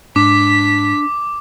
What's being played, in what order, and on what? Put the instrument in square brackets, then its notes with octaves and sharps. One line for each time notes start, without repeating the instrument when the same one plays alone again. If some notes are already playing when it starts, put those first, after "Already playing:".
[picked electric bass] G#2 [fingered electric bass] D4 [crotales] D6 [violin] B6